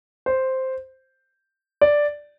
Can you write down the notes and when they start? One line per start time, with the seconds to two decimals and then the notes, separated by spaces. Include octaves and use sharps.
0.26 C5
1.81 D5